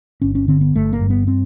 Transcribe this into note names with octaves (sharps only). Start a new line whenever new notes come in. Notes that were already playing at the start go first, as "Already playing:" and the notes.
G1 C#4
C#4
D3 C4
B3
G1 A3
A#3
G2
B3
C4